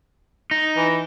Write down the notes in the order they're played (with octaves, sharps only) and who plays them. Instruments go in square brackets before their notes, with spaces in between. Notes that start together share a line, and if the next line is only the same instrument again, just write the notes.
[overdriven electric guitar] D#4
[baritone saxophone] E3